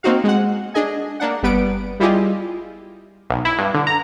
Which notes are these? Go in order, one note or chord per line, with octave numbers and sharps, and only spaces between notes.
A#3 C4 D#4 F#4 F5
G#3 F#5
D4 G#4 D#5 G#5
A#3 D4 F#5
G1 G3 B3 B4 F#5 D7
G3 E4 F4 G4 G#4 D#5
B1
E4
G2
D3
A#5